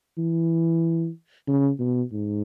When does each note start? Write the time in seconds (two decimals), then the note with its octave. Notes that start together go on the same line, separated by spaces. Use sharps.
0.18 E3
1.47 C#3
1.79 B2
2.12 G#2